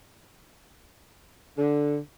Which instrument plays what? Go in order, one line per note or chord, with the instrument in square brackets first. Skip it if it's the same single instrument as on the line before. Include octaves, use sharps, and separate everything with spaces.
[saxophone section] D3